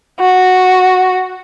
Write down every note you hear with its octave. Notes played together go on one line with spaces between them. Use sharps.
F#4